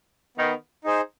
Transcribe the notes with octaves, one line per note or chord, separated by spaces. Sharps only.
D#3 B3
D#4 G#4 C5